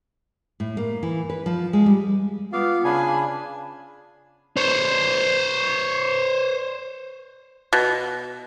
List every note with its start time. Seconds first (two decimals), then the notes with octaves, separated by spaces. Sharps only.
0.60 A2
0.77 A#3
1.03 E3
1.30 B4
1.46 F3
1.73 G#3
1.86 G3
2.53 B3 F4 F5 D6
2.84 C#3 D4 G#5 B5
4.57 C5 C#5
7.73 B2